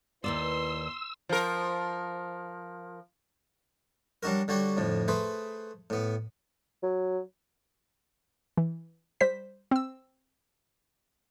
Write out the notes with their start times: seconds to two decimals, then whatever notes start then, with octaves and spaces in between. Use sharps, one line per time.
0.24 D#2 B2 E4 B4 D5 C6 E6
1.29 F3 A#4
4.23 F#3 G3 D4 F#4 A#4
4.48 D3 G3 F#4 G4 C#5
4.77 F2 A2 D3
5.08 A3 G#4 B4 C5
5.90 A2 B3
6.83 F#3
8.57 E3
9.21 G3 C5 B6
9.71 C4 E6